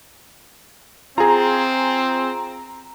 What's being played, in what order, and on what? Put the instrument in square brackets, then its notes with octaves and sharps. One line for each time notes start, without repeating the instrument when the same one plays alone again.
[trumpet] C4 [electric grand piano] F4 G#4 [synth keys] A#5